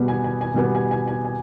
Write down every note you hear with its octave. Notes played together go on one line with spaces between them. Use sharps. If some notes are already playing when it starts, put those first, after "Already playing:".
Already playing: B2 G3 B3
G#5
G#5
G#5
B2 G3 B3 G#5
G#5
G#5
G#5
G#5